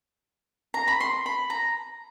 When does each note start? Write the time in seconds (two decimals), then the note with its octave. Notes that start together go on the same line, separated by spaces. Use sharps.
0.74 A#5
0.88 B5
1.00 C6
1.26 B5
1.50 A#5